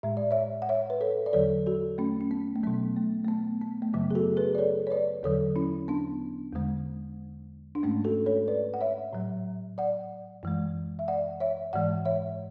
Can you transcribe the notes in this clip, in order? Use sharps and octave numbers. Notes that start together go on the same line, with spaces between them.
A2 G#3 E5
D5
C#5 E5
F#5
C#5 E5
B4
A4 C#5
D5
E2 D3 F#3 A4 C#5
F#4 A4
A3 C#4
C#4
B3
A3
B2 F#3 B3
A3
A3
B3
B3
A3
F#2 C#3 F#3 B3
G#4
F#4 A4
G#4 B4
D5
A4 C#5
C#5
B4 D5
E2 D3 F#3 A4 C#5
C#4 E4
B3 D4
E2 D3 G#3
D4
G#2 G#3 A3 C#4
F#4 A4
A4 C#5
B4 D5
F#5
C#5 E5
A2 F#3
D5 F#5
F#2 E3 G#3
E5
D5 F#5
C#5 E5
G#2 E3 G#3 D5 F#5
C#5 E5